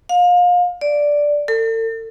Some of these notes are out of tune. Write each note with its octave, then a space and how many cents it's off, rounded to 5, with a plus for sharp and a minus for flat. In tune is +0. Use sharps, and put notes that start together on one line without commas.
F5 +30
D5 -5
A4 +40